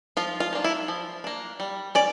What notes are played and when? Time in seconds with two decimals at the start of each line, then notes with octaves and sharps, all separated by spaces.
0.17 F3 F4
0.40 F4
0.53 A#3 D4
0.64 E4
0.88 F3
1.24 A#3 D4
1.60 G3
1.95 C#4 D5